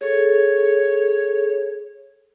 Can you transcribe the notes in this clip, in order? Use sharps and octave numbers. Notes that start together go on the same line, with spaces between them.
G#4 A4 C#5